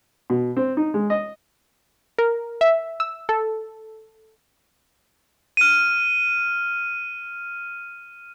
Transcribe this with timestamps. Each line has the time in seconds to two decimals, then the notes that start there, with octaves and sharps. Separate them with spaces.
0.30 B2
0.57 C4
0.77 D#4
0.94 G#3
1.10 D#5
2.19 A#4
2.61 E5
3.00 E6
3.29 A4
5.57 F6 D#7